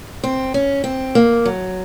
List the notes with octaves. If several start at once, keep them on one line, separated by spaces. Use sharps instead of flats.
C4
C#4
C4
A#3
F#3